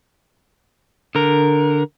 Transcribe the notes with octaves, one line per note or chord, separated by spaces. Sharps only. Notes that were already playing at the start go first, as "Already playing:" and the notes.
D3 A#4